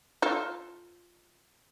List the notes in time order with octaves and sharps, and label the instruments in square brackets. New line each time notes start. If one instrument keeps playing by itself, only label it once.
[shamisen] F4 A4